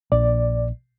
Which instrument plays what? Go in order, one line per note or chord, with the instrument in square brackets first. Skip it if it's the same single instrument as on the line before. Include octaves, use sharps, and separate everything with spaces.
[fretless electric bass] A#1 [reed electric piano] D5